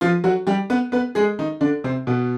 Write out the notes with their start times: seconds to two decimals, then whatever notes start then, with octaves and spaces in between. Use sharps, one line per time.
0.01 F3 F4
0.24 F#3 F#4
0.47 G3 G4
0.70 B3 B4
0.92 B3 B4
1.15 G#3 G#4
1.39 D#3 D#4
1.61 D3 D4
1.84 C3 C4
2.07 B2 B3